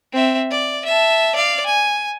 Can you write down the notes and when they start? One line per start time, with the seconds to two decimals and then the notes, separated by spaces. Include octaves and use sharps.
0.13 C4 E5
0.51 D5
0.85 E5 A5
1.36 D5 F5
1.66 G#5